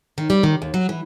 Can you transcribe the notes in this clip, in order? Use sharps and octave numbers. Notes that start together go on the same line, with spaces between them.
D#3
G3
D#3
D#2
F#3
E3